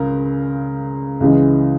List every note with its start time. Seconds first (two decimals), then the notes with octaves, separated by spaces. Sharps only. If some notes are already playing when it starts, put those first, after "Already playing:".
Already playing: C#2 C#3 A#4
1.20 C#2 C#3 E3 G#3